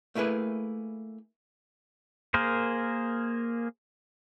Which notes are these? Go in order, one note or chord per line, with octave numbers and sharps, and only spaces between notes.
A3 A#3 E4 G#4 B4
A#3 G#4 A#4 C5